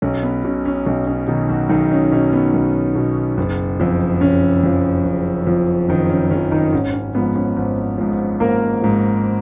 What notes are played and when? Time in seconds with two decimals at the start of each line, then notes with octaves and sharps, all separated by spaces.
0.02 B1 C#4
0.23 B3
0.44 B2 C#4
0.65 C#4
0.86 B1 C#4
1.07 C#4
1.28 B2 D#3 D#4
1.49 F#3 F#4
1.69 B1 D#3 D#4
1.91 C#4
2.12 B2 C#4
2.33 B3
2.54 B1
2.95 B2
3.38 F#1
3.80 F2 F3
4.21 F#1 C#4
4.64 F2 F3
5.05 F#1
5.47 F2 F3
5.89 F#1 D#3 D#4
6.10 C#4
6.31 F2 F3 C#4
6.51 D#3 D#4
6.72 G#1 C#4
6.94 C#4
7.15 G#2 F3 B3
7.35 C#4
7.56 G#1
7.98 G#2 F3
8.40 G#1 A#3 A#4
8.82 G#2 F3